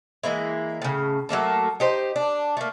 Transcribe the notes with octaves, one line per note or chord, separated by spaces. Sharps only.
E3 G#3 A#3 E4
A2 C#3
F#3 A3 A#3 A4
D#4 G4 C5
D4
A3 A#3